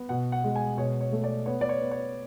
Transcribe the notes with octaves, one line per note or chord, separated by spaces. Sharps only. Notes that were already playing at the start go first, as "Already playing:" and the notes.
Already playing: B3
B2 F#5
F#5
G#3
G#5
B2 C#5
C#5
A3
D5
B3 C#5
D5
C#5
B3
C#5